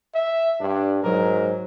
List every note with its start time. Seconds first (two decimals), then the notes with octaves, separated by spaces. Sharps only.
0.14 E5
0.60 G2 D4
1.03 G#2 F#3 A#4